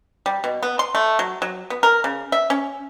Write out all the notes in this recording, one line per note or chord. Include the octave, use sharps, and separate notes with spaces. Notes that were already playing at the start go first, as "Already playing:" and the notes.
G3
B2
B3
C6
A3
F#3
F#3
B3
A#4
C#3
E5
C#4